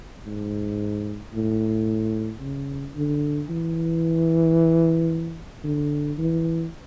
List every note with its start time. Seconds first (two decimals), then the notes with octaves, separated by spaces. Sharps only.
0.26 G#2
1.34 A2
2.41 C#3
2.95 D3
3.49 E3
5.64 D3
6.18 E3